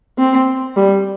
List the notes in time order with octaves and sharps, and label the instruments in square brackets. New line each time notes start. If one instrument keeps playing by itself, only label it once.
[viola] C4
G3